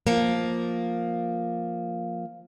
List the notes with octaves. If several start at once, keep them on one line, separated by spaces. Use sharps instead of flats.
F3 A#3